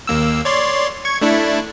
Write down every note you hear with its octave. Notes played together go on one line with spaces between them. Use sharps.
D#2 A#3 E6
C#5 D5 C6
C#6 G#6
A3 D4 E4